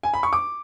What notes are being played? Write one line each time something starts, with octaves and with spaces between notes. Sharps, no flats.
G#5
B5
C#6
D6